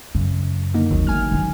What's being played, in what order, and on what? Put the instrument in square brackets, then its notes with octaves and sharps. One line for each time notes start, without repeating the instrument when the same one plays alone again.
[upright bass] F#2 [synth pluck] C#3
[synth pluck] D3 A#3 D#4
[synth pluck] G#1 F#3 [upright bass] D#2
[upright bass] A3 [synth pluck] G#5 F6
[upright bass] D#3 F#3